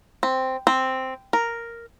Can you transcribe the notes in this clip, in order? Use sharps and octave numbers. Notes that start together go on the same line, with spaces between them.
C4
C4
A#4